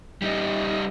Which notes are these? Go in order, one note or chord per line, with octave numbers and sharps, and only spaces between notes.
G3 D#4